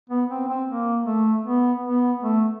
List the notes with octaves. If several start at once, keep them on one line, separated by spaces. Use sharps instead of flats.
B3
C4
C4
A#3
A3
B3
B3
A3